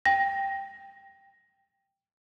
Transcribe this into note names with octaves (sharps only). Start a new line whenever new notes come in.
G5 A#6